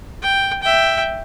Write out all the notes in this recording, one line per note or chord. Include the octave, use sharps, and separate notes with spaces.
G5
E5 G5